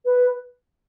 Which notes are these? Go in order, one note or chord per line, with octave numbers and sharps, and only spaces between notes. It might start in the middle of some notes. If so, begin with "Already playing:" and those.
B4